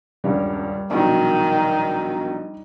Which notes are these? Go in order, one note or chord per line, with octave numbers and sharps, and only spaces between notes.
D#1 C#2 G2 G3
A#1 B2 D#3 F#3